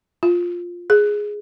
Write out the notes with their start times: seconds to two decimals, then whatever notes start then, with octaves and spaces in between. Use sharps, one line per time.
0.23 F4
0.90 G#4